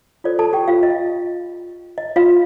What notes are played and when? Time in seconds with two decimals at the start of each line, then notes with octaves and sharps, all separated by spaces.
0.24 F4 A4 C5 D5
0.39 A4 A5
0.53 G4 G5
0.68 F4 F5
0.83 D#5
1.98 D#5
2.16 F4 F5